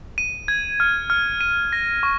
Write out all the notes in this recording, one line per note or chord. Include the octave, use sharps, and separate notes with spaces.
D#7
G#6
F6
F6
D#7
A#6
C#6